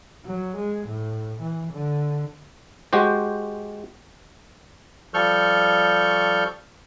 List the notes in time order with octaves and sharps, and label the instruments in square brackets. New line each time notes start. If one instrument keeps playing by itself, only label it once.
[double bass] F#3
G#3
A2
E3
D3
[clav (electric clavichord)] G#3 F#4 G4 C5
[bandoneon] F3 G3 A4 C#6 F6 G6